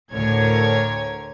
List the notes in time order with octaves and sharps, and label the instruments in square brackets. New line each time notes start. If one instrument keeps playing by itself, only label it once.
[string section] D2 A2 D3 A#4 C#5 G#6